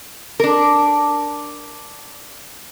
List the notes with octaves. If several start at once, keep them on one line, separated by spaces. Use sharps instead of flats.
D4 A#4